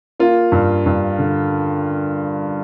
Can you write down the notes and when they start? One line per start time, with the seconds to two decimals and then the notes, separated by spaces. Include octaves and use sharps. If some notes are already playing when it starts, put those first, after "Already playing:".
0.20 A#3 F4
0.52 G2
0.86 G2
1.18 D3